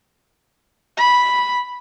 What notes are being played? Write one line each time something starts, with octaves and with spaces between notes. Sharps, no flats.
B5